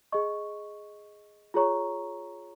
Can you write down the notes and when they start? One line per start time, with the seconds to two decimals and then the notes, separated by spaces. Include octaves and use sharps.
0.12 G#4 D#5 C#6
1.54 F4 G#4 C#5 A#5 C#6